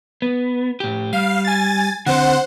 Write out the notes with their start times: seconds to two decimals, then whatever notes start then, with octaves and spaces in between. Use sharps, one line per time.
0.22 B3
0.80 A2 G4
1.13 G3 F5
1.45 G#5 A6
2.06 D3 C4 C5 F#5